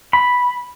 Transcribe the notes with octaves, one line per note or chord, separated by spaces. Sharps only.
B5